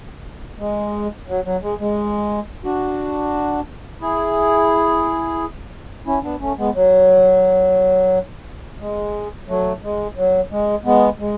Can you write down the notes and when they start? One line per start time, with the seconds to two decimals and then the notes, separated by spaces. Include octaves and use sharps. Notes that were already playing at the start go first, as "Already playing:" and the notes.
0.60 G#3
1.28 F#3
1.45 F#3
1.63 G#3
1.80 G#3
2.65 D4 F#4
4.01 E4 G#4
6.07 C#4 E4
6.24 B3 D4
6.41 A3 C#4
6.58 G#3 B3
6.75 F#3
8.80 G#3
9.49 F#3 A3
9.84 G#3
10.17 F#3
10.51 G#3
10.85 G#3 B3
11.20 G#3